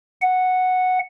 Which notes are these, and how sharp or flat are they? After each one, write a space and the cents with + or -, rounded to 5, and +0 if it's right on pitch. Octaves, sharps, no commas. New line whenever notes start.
F#5 -5